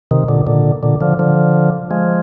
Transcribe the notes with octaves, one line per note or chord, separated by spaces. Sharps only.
C3 D#3
A#2 D3
A#2 D3
A#2 D3
D3 F3
D3 F3
F3 G#3